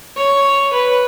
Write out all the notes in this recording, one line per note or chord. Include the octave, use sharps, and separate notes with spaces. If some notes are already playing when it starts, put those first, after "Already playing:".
C#5
B4